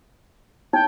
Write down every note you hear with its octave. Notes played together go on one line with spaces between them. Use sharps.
D#4 G5